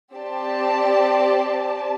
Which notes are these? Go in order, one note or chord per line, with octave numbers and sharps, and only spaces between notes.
C4 G4 D5 A5